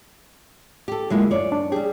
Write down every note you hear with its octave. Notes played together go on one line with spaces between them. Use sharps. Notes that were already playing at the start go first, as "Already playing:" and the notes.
G4 A4
D3 F#3 G#3 A#3 E4 F4
F#2 C#5 D5
D4
G3 G4 G#4